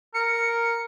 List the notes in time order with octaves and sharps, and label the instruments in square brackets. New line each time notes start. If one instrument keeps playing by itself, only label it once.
[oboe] A#4 [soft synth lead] C#7